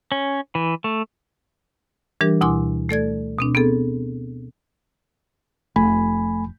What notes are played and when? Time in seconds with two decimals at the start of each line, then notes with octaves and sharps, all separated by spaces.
0.12 C#4
0.55 E3
0.84 A3
2.21 E3 G3 D4 G4 A#4
2.41 D2 B2 E4 G#5 C6 D6
2.89 A3 A4 D5 G#6
3.38 B2 C4 D4
3.55 B3 C4 G#4 A4
5.76 F1 A3 G#5 B5